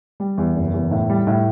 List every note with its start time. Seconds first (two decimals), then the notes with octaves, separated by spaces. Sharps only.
0.20 G3
0.38 E2
0.56 F#1
0.73 E2
0.91 A2
1.10 G3
1.27 A2